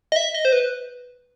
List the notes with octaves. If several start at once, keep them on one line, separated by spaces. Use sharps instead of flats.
D#5
E5
D#5
C5
B4